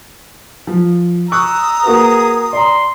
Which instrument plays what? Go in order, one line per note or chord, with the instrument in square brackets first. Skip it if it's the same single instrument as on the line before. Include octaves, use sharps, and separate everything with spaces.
[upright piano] F3
[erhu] A#5 [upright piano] C#6 F#6 [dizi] D#6 [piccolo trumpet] E6
[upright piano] A#3 F#4 B4 [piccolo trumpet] G#4
[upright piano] D5 A#5 [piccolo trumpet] C6